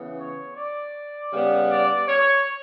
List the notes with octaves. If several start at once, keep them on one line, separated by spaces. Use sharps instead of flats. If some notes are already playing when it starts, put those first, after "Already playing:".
Already playing: C#3 E3 B3
C#5
D5
C#3 G3 B3
D5
C#5